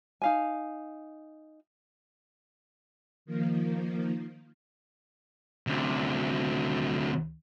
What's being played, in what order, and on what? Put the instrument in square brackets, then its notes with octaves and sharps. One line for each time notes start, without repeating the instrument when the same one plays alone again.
[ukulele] D#4 F5 G#5
[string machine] D#3 F3 A#3
[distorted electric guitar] D2 C3